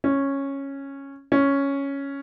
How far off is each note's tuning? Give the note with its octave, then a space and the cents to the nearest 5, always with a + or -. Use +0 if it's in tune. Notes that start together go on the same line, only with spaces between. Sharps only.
C#4 -10
C#4 +0